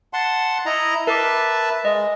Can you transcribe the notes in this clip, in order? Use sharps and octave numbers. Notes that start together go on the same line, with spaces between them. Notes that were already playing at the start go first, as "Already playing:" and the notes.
F#5 A5 C6
E4 D#5 A#5
A#4 B4 E5 A5 D6
G#3 D#5